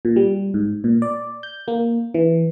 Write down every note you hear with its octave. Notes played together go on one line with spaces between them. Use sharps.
A#2
G3
G#2
A#2
D5
G6
A#3
E3